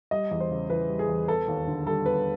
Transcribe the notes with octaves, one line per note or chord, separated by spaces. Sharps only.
G3 D#5
E2
C5
C#3
E3 B4
G3
G#4
E2
B3 A4
D#2
D3
G3 A4
B3 B4